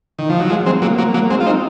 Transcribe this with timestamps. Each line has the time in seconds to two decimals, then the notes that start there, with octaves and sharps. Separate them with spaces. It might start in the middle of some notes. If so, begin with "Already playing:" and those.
0.19 D#3
0.30 F3
0.40 F#3
0.49 F3 G#3
0.66 G#3 C4
0.82 F#3 A#3
0.98 F#3 A#3
1.14 F#3 A#3
1.30 G#3 C4
1.40 F4
1.46 C4 D#4